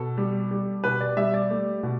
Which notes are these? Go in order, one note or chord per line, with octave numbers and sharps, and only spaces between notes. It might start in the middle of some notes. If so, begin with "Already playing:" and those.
Already playing: B2 A4
G3
G3
B2 B4
D5
G3 E5
D5
A3
B2